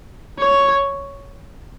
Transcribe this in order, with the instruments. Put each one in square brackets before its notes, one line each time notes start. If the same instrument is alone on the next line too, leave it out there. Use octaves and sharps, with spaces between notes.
[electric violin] C#5